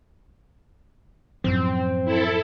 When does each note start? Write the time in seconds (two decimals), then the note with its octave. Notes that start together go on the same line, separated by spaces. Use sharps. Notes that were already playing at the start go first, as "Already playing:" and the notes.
1.44 F#2 A2 F3 C4
2.05 E4 A4